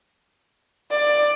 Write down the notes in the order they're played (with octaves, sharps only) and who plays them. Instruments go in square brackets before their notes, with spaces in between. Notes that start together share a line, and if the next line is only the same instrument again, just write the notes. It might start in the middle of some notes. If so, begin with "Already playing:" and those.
[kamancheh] D5